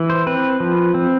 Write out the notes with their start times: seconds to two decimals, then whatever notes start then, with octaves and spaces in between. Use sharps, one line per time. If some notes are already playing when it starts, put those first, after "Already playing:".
Already playing: E3
0.10 C5
0.27 C4 B4
0.60 F3
0.94 C4